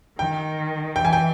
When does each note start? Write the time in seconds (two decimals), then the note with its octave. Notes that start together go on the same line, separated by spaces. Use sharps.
0.19 D#3 G5
0.95 E3 G5
1.05 G#5
1.13 G5